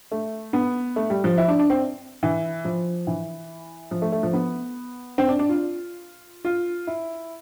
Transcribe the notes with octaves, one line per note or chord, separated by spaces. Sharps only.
A3
B3
A3
G3
F3
E4
D4
D4
C4
E3
F3
E3
F3
A3
A3
F3
B3
C4
D4
D4
F4
F4
E4